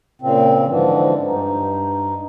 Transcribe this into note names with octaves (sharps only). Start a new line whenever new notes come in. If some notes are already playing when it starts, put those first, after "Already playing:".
A#2 C#3 C4
G#2 D3 E3 F3
G2 D#4